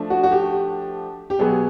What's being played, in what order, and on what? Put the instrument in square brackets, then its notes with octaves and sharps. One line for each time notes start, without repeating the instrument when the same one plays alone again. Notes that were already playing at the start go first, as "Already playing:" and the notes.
Already playing: [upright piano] F3 A3 D4
[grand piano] F#4
F#4
G4
G4
[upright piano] B2 F#3 B3 [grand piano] G#4